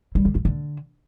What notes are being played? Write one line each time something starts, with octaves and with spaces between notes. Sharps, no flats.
G3
D3
E3
D3